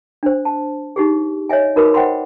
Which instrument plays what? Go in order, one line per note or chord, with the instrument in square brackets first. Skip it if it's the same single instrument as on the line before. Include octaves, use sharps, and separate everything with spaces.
[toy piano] D4 C5
A5
D#4 G4 G#4
C#5 D#5 E5 G#5
D#4 F#4 A#4 B4 B5 D6
C5 D#5 F#5 G5 B5 C6